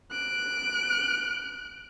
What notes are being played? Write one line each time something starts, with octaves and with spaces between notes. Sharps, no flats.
F#6 D7